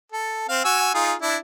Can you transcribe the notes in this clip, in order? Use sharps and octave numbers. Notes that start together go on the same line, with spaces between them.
A4
C4 F5
F#4 G#5 E6
D#4 F4 G#4
D4 E4